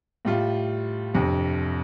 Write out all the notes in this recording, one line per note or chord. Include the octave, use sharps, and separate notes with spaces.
A2 G3 F4
G1 F2 C3